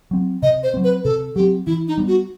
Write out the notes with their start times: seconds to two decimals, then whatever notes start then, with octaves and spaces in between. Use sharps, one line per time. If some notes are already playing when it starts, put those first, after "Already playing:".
0.11 F#3 C4
0.43 C3 D#5
0.63 C5
0.74 F#3 C4
0.84 B4
1.04 C3 A4
1.36 F#3 C4 G4
1.67 E3 E4
1.88 D#4
1.98 G3 B3
2.08 F#4